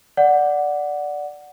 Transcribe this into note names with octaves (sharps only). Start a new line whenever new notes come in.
D5 F#5